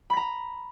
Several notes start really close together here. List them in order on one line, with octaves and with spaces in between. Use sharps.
B5 B6 A#5